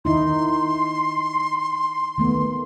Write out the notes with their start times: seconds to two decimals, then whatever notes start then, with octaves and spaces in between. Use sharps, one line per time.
0.05 D#3 D#4 E4 C6
2.18 D#3 A3 B3